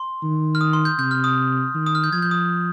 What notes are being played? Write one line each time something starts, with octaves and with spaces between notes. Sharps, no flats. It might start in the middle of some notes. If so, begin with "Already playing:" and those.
Already playing: C6
D#3
F6
D#6
C6
G6
C3 G6
F6
D#6
D#3
D#6
F6
G6
F3 G#6
G6
D#6